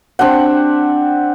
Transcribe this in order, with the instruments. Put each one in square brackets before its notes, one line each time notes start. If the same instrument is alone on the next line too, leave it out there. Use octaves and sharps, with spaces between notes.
[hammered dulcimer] C4 D4 G4 F#5